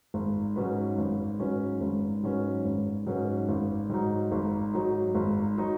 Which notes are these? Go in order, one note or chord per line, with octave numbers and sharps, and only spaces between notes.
G#1
G#2 F#3 C#4 B4
G#1
G#2 F#3 C#4 B4
G#1
G#2 F#3 C#4 B4
G#1
G#2 F#3 C#4 B4
G#1
G#2 F#3 D#4
G#1
G#2 F#3 D#4
G#1
F#3 D#4